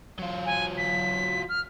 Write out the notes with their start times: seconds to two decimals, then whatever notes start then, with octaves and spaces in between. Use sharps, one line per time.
0.19 F#3 F4
0.46 G#5
0.77 B6
1.49 F6